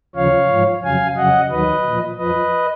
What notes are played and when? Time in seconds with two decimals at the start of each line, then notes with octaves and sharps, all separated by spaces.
0.15 D#2 C#3 F3 C#5 F5
0.50 G#2 F3
0.83 F2 C#3 F#3 F5 G#5
1.17 F2 C#3 F#3 D#5 F#5
1.51 D#2 D#3 F#3 B4 D#5
1.86 A#2 F3
2.19 F2 F3 B4 D#5